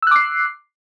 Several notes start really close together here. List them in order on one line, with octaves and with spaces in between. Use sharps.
E6 F#6 D6 C7